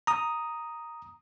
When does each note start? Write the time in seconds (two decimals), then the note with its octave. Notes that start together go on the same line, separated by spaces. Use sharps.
0.07 A#5 D#6